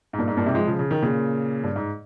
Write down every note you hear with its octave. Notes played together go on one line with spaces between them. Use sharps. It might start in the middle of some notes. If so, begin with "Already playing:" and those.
G#2
G2 A#2
G#2
G2 A#2
G#2 C3
F3 G#3
C#3 F3
C#3
D#3
A#2 C#3
G2
G#2